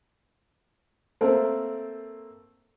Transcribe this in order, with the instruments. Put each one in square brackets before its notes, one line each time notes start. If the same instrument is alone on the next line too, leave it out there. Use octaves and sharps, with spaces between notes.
[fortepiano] A3 A#3 C4 A#4 C5